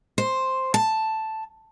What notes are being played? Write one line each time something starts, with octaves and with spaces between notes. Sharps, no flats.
C5
A5